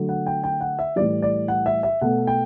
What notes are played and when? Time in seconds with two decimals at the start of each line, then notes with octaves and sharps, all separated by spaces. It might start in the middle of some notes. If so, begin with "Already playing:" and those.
Already playing: D3 F#3 A3
0.09 F#5
0.26 G5
0.44 G5
0.61 F#5
0.79 E5
0.96 A2 E3 G3 D5
1.22 D5
1.48 F#5
1.66 E5
1.83 E5
2.01 B2 A3 F#5
2.27 G5